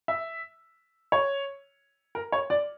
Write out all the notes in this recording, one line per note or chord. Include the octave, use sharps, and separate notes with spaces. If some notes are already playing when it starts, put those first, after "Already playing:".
E5
C#5
A#4
C#5
D5